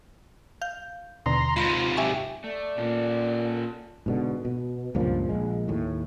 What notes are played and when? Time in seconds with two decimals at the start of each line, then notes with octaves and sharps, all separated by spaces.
0.62 F5 G6
1.26 D#2 B2 D3 A#5 C6
1.56 G#2 C3 F4 B5 C6 A#6
1.97 G4 E5 G#5 C#6
2.44 A3 D5
2.78 A#2 C#4 A4
4.06 G#2 B2 D3
4.45 B2
4.95 C#2 G2 A#2 F3
5.29 A#1 G#3
5.68 D#2 A2